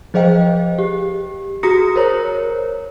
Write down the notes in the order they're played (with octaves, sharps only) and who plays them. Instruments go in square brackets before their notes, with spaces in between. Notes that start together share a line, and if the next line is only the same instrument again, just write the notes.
[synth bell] F3 G#4 C5 D#5 F5 G5
G4
F#4 G#4 A#5 D#6 A#6 C#7
A#4 C5 C#5 A#5